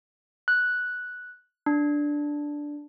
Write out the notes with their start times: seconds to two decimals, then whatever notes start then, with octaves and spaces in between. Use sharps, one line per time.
0.48 F#6
1.66 D4